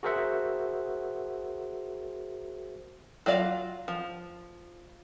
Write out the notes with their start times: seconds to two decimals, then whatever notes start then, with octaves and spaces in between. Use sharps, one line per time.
0.03 F#4 G#4 A#4 C5 E5 F#5
3.26 F#3 F4 D5 F5
3.88 F3